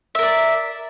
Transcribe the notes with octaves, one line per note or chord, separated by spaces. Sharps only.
A#4 D5 E5